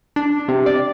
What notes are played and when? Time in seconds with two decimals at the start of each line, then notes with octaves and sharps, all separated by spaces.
0.16 D4
0.48 C3
0.66 D5